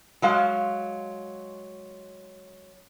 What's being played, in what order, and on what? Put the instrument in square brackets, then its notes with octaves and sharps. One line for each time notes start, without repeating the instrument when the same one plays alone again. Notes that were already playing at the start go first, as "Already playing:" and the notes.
[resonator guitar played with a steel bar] F#3 G#3 F5